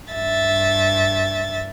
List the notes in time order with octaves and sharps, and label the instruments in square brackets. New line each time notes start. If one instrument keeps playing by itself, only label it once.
[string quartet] G2 E5 A6